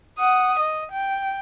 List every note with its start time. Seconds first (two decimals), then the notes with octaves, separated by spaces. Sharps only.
0.19 F#5 D#6
0.59 D#5
0.92 G5